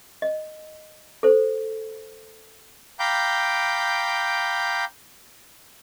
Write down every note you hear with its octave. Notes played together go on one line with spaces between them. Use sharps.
D#5
A4 C5
F5 G5 A#5 B5 D6 G6